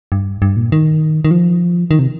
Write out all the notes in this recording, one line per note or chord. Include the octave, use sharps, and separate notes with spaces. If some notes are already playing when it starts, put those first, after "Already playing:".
G2
G2
A#2
D#3
D#3
F3
D#3
C3